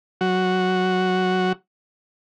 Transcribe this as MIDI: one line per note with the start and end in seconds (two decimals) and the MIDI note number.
0.21 1.52 54
0.21 1.52 66